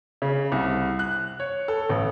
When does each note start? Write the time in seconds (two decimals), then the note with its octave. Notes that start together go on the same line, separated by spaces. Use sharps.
0.22 C#3
0.52 C2
0.99 F#6
1.40 C#5
1.68 A4
1.90 A1